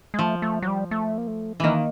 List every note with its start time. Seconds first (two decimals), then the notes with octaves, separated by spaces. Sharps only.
0.14 G#3
0.19 F3 A3
0.42 A3
0.62 F#3
0.68 G3
0.91 A3
1.18 A#3
1.27 A3
1.60 D#3 E3 A#3